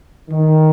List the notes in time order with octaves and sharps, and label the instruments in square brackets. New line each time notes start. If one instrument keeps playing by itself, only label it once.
[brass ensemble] D#3